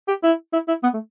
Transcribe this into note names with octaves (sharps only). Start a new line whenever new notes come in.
G4
E4
E4
E4
B3
A3